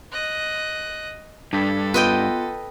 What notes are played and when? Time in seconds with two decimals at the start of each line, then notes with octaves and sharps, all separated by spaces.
0.12 D#5 F#6
1.53 G2 D4 A4 B6
1.94 B3 F4 B4 D#5 G5